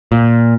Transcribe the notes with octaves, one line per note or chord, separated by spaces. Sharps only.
A#2